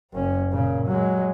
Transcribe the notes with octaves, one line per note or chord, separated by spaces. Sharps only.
F#1 C#4
A#2 C#3
F#3 G#3